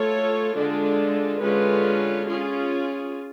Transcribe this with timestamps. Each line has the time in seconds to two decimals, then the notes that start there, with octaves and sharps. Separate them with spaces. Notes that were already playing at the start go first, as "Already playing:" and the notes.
Already playing: A3 F4 A4 C#5
0.56 D3 G#3 D4 F4 A4
1.41 D3 G#3 C#4 F4 B4
2.27 C#4 F4 G#4